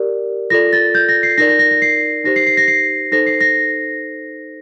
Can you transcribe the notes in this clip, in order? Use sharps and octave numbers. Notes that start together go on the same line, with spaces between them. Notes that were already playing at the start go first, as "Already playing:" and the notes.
Already playing: G4 A#4 D5
F4 A4 D5 A#6
A6
G6
A#6
C7
D#4 A#4 D5 A#6
A#6
A#6
A#6
C7
D#4 G4 C5 A#6
C7
C7
A#6
C7
D#4 A4 C5 A#6
C7
A#6